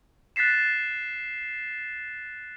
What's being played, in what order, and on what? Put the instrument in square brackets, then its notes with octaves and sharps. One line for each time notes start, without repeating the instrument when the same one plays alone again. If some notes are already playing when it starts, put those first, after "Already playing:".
[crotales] F#6 A6 B6 C7 E7